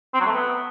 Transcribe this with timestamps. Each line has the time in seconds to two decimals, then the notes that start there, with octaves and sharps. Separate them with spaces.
0.14 C4
0.20 F#3
0.26 A3
0.32 B3